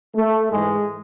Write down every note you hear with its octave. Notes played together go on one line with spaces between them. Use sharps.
A3
G#2 E3 G#3